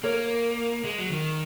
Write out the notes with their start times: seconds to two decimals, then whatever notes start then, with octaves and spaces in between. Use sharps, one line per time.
0.03 A#3 A#4 C#5
0.84 G#3
0.98 F#3
1.11 D#3